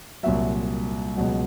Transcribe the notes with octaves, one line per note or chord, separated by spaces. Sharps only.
C2 A#2 F#3 E5
C#2 B2 F#3